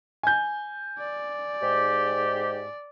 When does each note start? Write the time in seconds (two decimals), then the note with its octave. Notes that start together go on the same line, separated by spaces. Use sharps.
0.23 G#5 G6
0.99 D5
1.63 G#2 G4